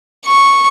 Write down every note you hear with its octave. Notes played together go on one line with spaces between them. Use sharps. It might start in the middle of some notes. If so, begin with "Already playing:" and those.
C#6